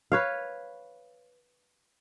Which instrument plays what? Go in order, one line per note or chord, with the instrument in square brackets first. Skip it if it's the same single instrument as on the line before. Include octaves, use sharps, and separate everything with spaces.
[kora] B4 C#5 F5